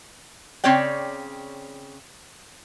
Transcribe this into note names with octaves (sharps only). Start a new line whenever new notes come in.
C#3 C4 C#5 D5 G5